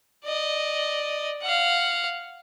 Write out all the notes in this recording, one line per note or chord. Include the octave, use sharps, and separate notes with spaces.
D5 D#5
F5 F#5